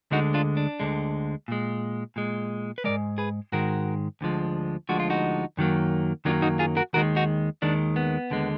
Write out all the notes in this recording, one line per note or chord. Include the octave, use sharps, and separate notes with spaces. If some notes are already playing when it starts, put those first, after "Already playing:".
D2 D3 G#3 D#4 F#4
D4 F4
D4
D2 D3 G#3
A#2 G#3
A#2 G#3
B4
G#2 D#3 G#3 A#4 D5
G#4 B4
G#2 D#3 G#3 F#4 A#4
D2 D3 F3 G#3
D2 D3 F3 G#3 F#4
F4
D#4 F#4
F#2 D#3 F#3 A#3
F#2 D#3 F#3 A#3 D4 F4
D#4 F#4
F4 G#4
F#4 A#4
D#2 D#3 G#3 F#4 A#4
D#4 F#4
D#2 D#3 G#3 D4
B3
D#2 D3 G#3